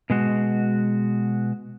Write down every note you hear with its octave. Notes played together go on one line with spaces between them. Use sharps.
B2 G#3 F#4